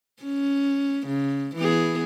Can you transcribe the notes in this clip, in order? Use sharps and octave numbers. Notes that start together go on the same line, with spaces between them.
C#4
C#3
E3 B3 G#4